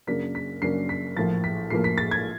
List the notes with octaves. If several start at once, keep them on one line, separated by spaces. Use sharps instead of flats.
F#2 C#3 F#3 A#3 D4 B6
B6
F#2 C#3 F#3 A#3 D4 C7
B6
A#1 A2 F3 A#3 A6
B6
A#1 A2 F3 A#3 C7
B6
A6
G#6